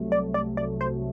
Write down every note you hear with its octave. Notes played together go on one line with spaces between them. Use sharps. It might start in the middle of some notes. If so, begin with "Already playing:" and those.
Already playing: C2 C3 F#3 A3
D5
D5
D5
C5